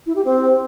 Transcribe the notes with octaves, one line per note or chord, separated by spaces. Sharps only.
E4
G4
C4